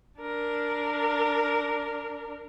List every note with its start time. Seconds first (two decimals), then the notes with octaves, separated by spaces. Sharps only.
0.20 D4 A#4